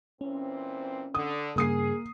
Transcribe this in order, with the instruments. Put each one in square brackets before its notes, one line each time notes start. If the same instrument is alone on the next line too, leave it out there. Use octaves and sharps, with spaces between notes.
[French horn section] A#2 E3 C4 [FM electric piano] C#4
[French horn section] D3 [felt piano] D#6
[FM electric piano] G2 C#3 [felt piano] A#3 D#6 C7 [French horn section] G#4